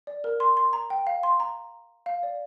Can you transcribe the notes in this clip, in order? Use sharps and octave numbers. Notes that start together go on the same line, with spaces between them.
D5
A#4
C6
C6
A#5
G5
F5
C6
A#5
F5
D5